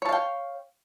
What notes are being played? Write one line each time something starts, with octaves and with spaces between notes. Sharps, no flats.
C#5 F5 G5 A5